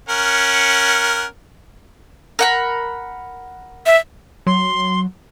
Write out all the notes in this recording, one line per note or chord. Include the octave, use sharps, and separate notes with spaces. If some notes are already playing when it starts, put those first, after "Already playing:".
C#4 A#4 F#5
A#4 F#5 B5
E5
F#3 C6